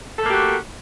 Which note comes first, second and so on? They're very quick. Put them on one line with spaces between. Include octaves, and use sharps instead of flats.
A4 A3 A#3 G4 F#4